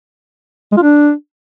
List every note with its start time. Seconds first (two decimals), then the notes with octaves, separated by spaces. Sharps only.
0.72 G#3
0.77 F4
0.82 D4